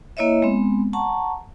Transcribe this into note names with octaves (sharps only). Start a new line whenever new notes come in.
A#3 E4 C#5 D#5 E5
G#3 B3 C4
F#5 A5 A#5 C#6